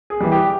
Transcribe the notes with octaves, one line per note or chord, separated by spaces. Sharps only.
G#4
E3 G3
G4